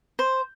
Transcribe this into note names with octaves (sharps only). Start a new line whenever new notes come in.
C5